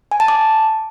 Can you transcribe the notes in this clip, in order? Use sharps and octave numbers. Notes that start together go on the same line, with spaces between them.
G#5
A5
D6